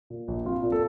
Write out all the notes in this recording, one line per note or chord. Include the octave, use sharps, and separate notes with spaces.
A#2
A#1
C4 F4
A#2
A4